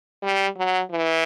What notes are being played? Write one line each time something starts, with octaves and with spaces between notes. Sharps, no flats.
G3
F#3
E3